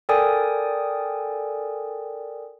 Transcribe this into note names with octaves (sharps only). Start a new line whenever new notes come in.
A4 A#4 D5 G5 G#5 D#6